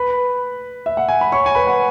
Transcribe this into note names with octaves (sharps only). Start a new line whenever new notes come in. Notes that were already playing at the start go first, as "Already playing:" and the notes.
Already playing: B4 B5
E5
F#5
G#5
B5
C#5 C#6
G#5
B4 B5
F#5